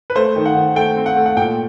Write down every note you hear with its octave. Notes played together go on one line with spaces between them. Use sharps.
B4
A3 C5
D#3
F#5
D#3
A3 G5
C4
F#5
A3
F#5
A#2 G5